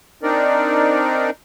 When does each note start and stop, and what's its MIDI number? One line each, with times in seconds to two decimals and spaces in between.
0.23 1.30 60
0.23 1.30 62
0.23 1.30 63
0.23 1.30 70
0.23 1.30 74